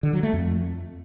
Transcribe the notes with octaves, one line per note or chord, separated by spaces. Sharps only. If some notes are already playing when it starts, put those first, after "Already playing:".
D3
F#3
A3
F2